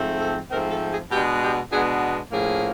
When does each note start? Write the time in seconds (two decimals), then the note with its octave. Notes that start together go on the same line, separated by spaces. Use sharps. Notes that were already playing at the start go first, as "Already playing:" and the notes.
Already playing: G#2 F3 A3 C4
0.20 A4
0.50 G#2 F3 A3 C4 A#4
0.71 A4
0.91 G#4
1.11 B2 G#3 B3 D4 G4
1.42 G4
1.72 B2 G#3 B3 D4 G#4
2.32 A2 F3 A#3 C#4 G#4